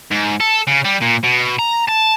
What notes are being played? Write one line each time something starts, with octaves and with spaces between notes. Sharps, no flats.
G#2
A4
C#3
G3
A#2
B2
A#5
A5